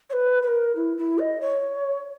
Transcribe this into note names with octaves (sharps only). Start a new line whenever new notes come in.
C#5
B4
B4
A#4
E4
E4
D#5
C#5